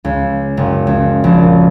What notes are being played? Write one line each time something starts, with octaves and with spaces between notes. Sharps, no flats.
C#2
F#1
C#2
A#1
A#2